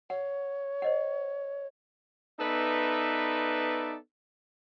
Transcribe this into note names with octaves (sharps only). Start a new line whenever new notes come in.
C#5 F#5
C5 D#5 F#5
B3 D#4 A4 B4 D5 E5